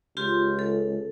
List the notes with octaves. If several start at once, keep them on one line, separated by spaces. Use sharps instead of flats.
C#2 F4 G4 C6
A4